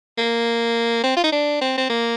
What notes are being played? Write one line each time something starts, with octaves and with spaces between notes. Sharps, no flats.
A#3
C4
F4
D#4
D4
C4
C4
A#3